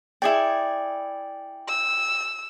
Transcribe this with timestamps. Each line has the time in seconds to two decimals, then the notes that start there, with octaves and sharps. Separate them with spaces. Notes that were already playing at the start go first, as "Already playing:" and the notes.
0.22 E4 G#4 D5 G5
1.68 E6